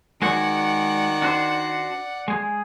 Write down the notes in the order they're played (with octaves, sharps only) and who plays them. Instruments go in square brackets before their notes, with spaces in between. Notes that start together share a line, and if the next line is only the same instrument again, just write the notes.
[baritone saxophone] D#3 [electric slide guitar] G#3 F#4 C#5 [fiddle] D5 F#5
[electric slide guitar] D4 F#4 C5
G#3 G#4